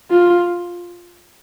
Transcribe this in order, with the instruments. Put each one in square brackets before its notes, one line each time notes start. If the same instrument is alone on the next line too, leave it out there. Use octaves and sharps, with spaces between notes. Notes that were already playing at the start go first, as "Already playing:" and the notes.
[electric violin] F4